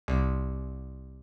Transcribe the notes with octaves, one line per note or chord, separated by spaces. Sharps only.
C2